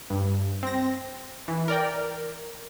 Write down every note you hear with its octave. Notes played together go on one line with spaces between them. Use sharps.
G2
C4 A#6
E3
A#4 D5 G5